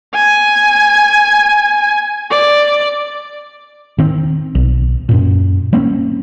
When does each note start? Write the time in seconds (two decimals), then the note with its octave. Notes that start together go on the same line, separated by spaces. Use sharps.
0.14 G#5
2.31 D5
3.98 D#3 C4
4.55 B1
5.09 F#2 A#2
5.73 G3 A#3 C4 C#4